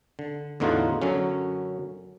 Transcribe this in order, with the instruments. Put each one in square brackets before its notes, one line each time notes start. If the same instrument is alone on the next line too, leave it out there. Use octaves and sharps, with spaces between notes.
[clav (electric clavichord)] D3
E2 A2 D3 D#4 F4 F#4
F#2 D3 F#3 C#4